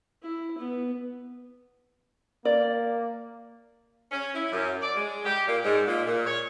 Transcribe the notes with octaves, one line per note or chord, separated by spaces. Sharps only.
E4
B3
A#3 D5
C#4
E4
F#2
D5
G#3
G4
A#2
G#2
A#2
A#2
C#5